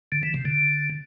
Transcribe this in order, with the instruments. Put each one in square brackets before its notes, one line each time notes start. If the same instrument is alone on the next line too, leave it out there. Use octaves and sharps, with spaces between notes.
[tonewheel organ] D3
E3
C3
D3